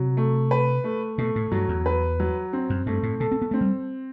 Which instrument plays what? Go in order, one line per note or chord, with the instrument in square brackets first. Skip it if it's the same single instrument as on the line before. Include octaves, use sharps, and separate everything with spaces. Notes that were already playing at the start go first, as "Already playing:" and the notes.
Already playing: [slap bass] C3 [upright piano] F#3
[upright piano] A3
B4
A3
[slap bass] B2 [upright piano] A3
[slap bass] A2
[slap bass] G2 [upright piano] F#3
[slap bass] E2
[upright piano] B4
F#3
C4
[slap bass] F#2
[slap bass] G2 [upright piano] A3
[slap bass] A2
[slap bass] B2 [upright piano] A4
[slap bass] C4
B3
[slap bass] A3 [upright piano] C4
[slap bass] G3